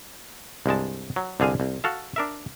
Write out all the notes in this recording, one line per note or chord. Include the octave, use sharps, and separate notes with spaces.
C2 G2 G#3 A5
F#3
C2 D3 G#4 F5 G#5
C2
F#4 A4 F5
D4 A#4 E5